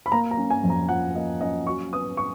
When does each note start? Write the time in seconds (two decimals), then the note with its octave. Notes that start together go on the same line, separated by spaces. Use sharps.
0.06 B5
0.12 A#3 A#5
0.31 A#5
0.37 C#4
0.50 G#5
0.63 F2
0.70 A#5
0.89 F3 F#5
1.15 A#3 D#5
1.41 C#4 D#5
1.67 F#3 C#6
1.92 B3 D#6
2.17 C#6